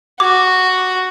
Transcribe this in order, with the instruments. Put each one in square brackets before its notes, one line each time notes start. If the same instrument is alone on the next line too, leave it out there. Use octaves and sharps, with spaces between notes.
[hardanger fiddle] F#4 [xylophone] D6